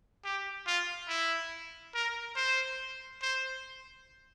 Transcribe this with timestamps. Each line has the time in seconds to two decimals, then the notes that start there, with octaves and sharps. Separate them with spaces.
0.25 G4
0.67 F4
1.09 E4
1.95 A#4
2.36 C5
3.22 C5